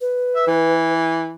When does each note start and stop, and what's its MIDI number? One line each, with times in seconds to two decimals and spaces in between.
0.01 0.92 71
0.36 0.47 76
0.47 1.35 52